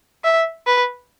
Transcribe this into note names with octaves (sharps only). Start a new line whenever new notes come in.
E5
B4